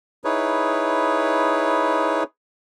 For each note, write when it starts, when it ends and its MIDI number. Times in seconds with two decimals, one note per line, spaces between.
0.24 2.23 63
0.24 2.23 64
0.24 2.23 68
0.24 2.23 71
0.24 2.23 73